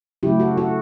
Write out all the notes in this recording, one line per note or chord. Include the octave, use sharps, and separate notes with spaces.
C#3 F#3 A3 E4 G4
F#4 A4
F#4 A4